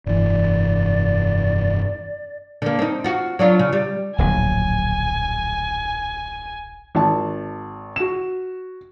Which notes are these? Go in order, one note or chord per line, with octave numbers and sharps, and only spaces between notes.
F1 G2 E3 D5
D3 A#3
C4 D#4
F4 F#4
F#3 D4 F4
C#3
G3
D1 A#1 F#3 G#5
G#1 A5
F#4 E7